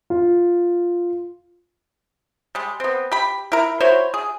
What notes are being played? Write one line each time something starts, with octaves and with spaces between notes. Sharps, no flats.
F4
G3 G#3
B3 C4
G4 B5
E4 A#4
E4 F#4 C5 C#5
G#4